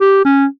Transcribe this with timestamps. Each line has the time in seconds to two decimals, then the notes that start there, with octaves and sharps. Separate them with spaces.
0.01 G4
0.25 C#4